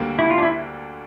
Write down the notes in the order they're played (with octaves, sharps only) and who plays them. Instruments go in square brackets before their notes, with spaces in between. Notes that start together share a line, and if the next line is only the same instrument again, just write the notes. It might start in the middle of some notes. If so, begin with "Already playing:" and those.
Already playing: [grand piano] D2 D3 G3 A#3
[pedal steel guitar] E4
F4
D4
E4